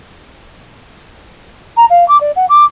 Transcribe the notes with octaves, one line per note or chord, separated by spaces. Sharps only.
A#5
F5
D6
D5
F#5
D6